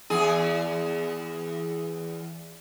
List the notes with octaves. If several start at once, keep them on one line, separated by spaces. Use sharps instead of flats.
E2 G#4